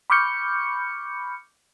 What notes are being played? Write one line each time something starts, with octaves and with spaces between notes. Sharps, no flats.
B5 C#6 D6 F6 G6 C#7